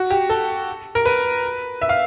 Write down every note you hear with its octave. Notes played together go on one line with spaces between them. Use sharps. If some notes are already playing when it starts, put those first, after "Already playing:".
Already playing: F#4
G4
A4
A#4
B4
E5
F5